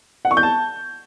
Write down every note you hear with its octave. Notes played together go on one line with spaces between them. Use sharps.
F#5
C#6
G6
A5